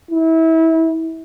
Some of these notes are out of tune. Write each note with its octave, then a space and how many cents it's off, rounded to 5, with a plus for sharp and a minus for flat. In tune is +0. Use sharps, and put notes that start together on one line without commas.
E4 -25